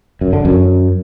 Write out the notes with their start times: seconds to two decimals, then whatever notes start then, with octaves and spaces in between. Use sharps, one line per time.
0.21 F#2
0.33 D3
0.45 F#2